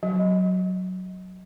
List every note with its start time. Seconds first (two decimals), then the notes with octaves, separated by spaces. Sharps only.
0.03 F#3